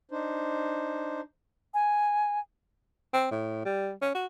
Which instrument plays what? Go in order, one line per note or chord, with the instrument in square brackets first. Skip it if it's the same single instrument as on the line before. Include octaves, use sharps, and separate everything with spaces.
[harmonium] D4 D#4 C5
[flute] G#5
[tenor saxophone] C4
A2
G3
C#4
F#4